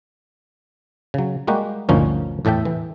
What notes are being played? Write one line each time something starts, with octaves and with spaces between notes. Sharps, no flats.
C#3 F#3
G3 G#3 A#3 F#4 G4
G1 D2 A#2 F3 C#4 D#4
E2 A2 A4 E5 G5
E3